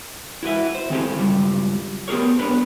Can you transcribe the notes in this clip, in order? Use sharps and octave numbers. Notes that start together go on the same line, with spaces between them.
E4 F#4 B4 E5
C5
D#3 C4 C#4 G4 A4
C#2 G2 F#3 G3
B3 G4 G#4 A#4 C#5
B3 D4 B4 C#5